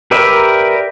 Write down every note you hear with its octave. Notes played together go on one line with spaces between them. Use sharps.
G4 A#4 B4 D5 E5